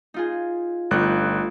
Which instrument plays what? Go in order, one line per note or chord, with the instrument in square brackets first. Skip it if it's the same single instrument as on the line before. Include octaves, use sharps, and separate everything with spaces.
[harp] D#4 F4 G#4
[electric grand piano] G1 F#6 [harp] A3 D#4 F4